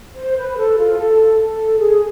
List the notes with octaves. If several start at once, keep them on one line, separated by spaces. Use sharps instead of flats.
C5
B4
A4
F4
A4
A4
G#4